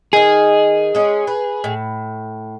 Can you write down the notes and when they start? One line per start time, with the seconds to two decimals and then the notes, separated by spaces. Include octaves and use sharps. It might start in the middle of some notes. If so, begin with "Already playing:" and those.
0.13 D#3 D#4 G#4
0.95 G#3 C#4
1.27 B4
1.64 A2